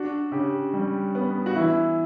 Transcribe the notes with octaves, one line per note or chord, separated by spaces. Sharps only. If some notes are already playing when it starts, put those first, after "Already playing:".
Already playing: D4 F#4
C#3 G4
G3
B3
F#4
E3 E4